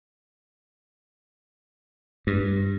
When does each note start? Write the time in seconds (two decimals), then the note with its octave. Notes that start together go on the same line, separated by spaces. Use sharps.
2.27 G2